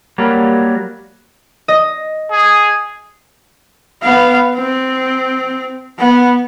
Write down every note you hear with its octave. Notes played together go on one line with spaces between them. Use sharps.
F#3 G3 A#3
D#5
G#4
B3 F5
C4
B3